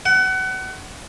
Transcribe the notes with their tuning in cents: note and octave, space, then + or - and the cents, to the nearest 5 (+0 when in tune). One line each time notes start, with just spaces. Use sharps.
F#5 +30